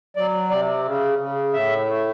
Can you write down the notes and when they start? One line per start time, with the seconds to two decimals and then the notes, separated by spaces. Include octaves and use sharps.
0.16 F#3 D5
0.51 C3 D5
0.85 C#3
1.19 C#3
1.53 A2 E5
1.88 A3